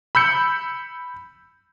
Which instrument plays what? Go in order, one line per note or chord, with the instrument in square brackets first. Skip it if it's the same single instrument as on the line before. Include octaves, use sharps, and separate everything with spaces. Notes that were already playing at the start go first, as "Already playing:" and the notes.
[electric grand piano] B5 E6 G6 C#7